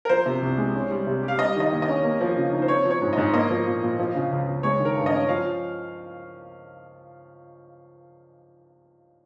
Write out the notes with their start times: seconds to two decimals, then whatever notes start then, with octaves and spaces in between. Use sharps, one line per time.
0.05 A#4
0.09 F3 C5
0.26 C3
0.42 C2
0.58 G#3
0.75 C#4
0.91 G3
1.07 C3
1.23 G4
1.28 F5
1.39 G3 D#5
1.56 D#3 D#5
1.71 D#2
1.82 D#5
1.88 C#4
2.04 A#3
2.21 F3
2.37 C#3
2.53 D#4
2.62 C5
2.68 C4 C#5
2.85 F3
2.90 C#5
3.02 G#2
3.13 G#2 D#5
3.33 A#3 D#5
3.50 F3
3.67 A#2
3.82 A#2
3.99 F3
4.15 C#3
4.31 C#2
4.47 C#2
4.63 G#3 C#5
4.79 D#3
4.85 A#4
4.97 G2
5.06 D#5
5.12 C#4
5.29 F3 F5